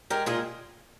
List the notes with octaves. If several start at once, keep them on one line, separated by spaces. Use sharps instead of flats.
G#3 G4 A#4
A#2 F4 G#4